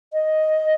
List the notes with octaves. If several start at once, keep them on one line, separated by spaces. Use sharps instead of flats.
D#5